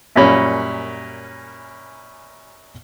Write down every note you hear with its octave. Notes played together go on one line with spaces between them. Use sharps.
F#2 A#2 G3 C#4 B5